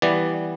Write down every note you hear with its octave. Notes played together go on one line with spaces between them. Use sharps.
E3 G3 B3 D5